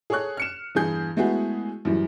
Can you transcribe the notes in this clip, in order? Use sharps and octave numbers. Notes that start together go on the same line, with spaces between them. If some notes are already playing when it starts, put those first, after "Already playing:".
G#4 A4 C#5 C#6 F#6
F6 C#7 E7
E2 G2 G#4 G6
G#3 A3 B3 E4 F#4 G#4
F#2 A2 E3 G3